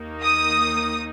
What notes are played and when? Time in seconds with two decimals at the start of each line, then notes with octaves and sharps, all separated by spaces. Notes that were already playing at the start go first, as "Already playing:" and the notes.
Already playing: D#2 D#3 A#3 D#4
0.23 D#6